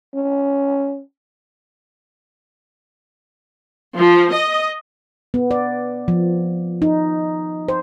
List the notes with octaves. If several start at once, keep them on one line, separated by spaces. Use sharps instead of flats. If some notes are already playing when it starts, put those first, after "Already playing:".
C#4
F3
D#5
B3
D5
F3
D#4
C5